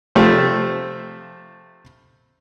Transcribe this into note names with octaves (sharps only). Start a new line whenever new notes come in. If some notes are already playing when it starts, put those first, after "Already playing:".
C3 F3 A3 C4